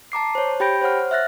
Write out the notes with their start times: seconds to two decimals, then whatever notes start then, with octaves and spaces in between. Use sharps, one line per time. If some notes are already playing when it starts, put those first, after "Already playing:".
0.12 A5 A#5 D6 C7
0.35 C5 C#5
0.60 G4 G5 B5 G6 A#6 D7
0.81 C5 C#5 F#5 F6
1.11 E5 F6 F#6 A6 A#6